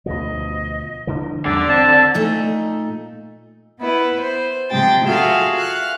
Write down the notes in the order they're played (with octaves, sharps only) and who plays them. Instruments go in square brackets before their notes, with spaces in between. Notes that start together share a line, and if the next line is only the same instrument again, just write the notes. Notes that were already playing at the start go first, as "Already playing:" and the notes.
[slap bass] D2 B2 F3 [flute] D#5
[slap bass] D3 E3 F3
[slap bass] E2 G3 [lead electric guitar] D3 [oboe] D5 [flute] E6
[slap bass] C4 [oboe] A5
[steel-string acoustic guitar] A#2 A3 D#4
[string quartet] B3 E4 B4
C5
C3 F3 G#3 G5 A6
F4 F#4 G#4 A4 E5 F5
F5 F#6